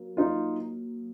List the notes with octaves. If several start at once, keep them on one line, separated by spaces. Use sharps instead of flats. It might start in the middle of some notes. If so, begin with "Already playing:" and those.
Already playing: F#3 A#3
D#4 F4